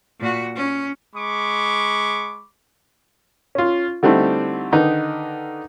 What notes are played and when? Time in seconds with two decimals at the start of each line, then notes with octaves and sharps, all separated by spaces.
0.19 A#2 F#4
0.56 C#4
1.15 G#3 B5 C#6 D6
3.55 C#4 F4
4.03 D3 G3 A3 C4 D#4 E4
4.72 D3 D#3 D#4 B4